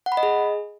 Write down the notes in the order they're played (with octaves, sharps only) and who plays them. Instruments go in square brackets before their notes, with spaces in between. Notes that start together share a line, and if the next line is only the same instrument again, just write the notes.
[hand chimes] F#5
B5
D#5
G#4